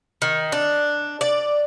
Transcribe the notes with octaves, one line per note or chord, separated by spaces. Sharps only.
D#3
D4
D5